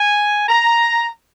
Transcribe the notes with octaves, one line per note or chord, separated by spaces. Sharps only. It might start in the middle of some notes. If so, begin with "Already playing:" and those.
Already playing: G#5
A#5